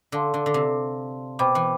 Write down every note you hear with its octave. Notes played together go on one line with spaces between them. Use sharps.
D3 A4 D5 F5 A5 C6
D3
D3
C3
B2 C5 G5 B5 D6
E3